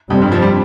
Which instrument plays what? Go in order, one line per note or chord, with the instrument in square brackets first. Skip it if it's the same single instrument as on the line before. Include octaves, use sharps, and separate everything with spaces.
[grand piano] F2 [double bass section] C3 G3 C4
[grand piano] G2
F2 F3
G3